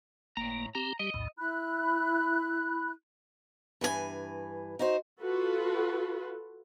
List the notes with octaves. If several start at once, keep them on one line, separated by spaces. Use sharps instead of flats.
G1 A2 A#3 A#5
C4 G4 A#5
G3 G4 D#5
B1 E2 A2
E4 B5 F#6
G2 E3 G#4 G#5
D#4 F#4 C5
F4 F#4 A4 B4